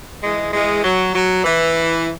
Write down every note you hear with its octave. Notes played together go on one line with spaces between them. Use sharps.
E3 G#3
E3 G#3
F#3
F#3
E3